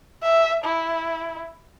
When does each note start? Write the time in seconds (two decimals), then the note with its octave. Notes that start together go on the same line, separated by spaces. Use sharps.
0.23 E5
0.64 E4